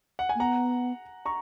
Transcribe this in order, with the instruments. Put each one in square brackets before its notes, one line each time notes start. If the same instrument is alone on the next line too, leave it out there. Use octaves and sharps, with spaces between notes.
[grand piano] F#5
G#5
[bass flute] A#3
[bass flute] B3 [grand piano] F#5 A#5
[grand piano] A#5 C#6